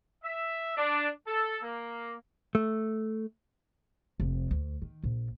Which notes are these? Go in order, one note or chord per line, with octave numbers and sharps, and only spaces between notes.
E5
D4
A4
A#3
A3
F1
D2
D#3
A#1